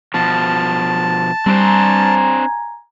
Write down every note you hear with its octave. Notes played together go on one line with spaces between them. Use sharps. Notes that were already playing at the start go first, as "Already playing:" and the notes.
B2 F3 A5
G3 C4 D4 C5 G#5 A#5